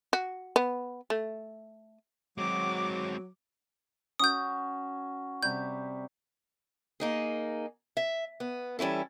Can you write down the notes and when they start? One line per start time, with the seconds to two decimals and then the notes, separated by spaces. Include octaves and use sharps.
0.13 F#4
0.56 B3
1.10 A3
2.38 F#3 G#3 C4 D6
4.19 C#4 F#4 D#6 G6
5.43 C3 G3 G6
7.00 A#3 D#4 G#4
7.97 E5
8.40 B3
8.79 E3 G3 C#4 E4 A4